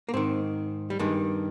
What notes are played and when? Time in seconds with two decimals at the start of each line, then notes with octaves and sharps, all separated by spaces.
0.09 A#3
0.13 G#2 D#3 C4
0.90 G3
0.99 G2 D#3 G#3